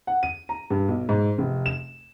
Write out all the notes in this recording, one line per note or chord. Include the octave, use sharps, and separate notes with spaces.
F#5
D#7
A#5
G2
B1
G#2
F1
E7